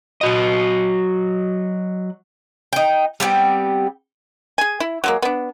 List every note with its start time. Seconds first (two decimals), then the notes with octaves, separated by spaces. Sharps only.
0.21 F#3 F#4 D#5
2.73 D#4 G5
3.20 G3 B3 C4 G4
4.58 G#4 G#5
4.80 E4
5.04 F#3 G#3 A#3
5.22 B3 D4